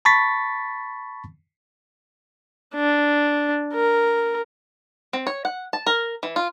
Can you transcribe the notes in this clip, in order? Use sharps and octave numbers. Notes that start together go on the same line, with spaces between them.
A5 B5 C#6 A6 B6
D4
A#4
C4
C#5
F#5
A5
A#4
E3
F4